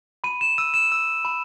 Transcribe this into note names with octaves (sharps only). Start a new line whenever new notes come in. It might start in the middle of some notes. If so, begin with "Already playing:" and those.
B5 D#7
E7
E6 D#7
E7
E6
B5